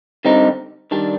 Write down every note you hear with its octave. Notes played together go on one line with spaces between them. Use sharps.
D3 G3 C4 D#4
D#3 G3 D4